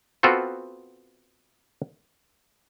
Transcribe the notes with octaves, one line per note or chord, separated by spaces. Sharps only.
B3 C4 F4 F#4 A4 C5